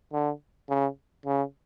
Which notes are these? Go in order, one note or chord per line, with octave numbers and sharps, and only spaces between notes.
D3
C#3
C#3